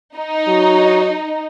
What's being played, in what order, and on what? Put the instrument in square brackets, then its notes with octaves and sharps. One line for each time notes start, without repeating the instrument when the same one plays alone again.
[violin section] D#4
[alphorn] F#3